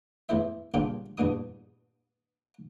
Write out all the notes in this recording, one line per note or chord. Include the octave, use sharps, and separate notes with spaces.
E2 A2 E4 C5 E5
A#2 C#3 G3 D4 F4 G4
E2 G2 A#2 D4 D#6